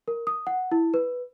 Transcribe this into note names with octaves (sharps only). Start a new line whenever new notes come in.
A#4
D#6
F#5
E4
B4